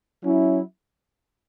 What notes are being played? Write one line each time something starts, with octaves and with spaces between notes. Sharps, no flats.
F#3 C#4 E4